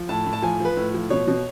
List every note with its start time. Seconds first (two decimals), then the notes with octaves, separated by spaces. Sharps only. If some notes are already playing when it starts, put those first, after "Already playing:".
Already playing: F3
0.09 A2 A5
0.26 A2
0.33 A5
0.42 F3 G#5
0.60 F3 B4
0.77 A2
0.94 F3
1.10 B2 C#5
1.27 B2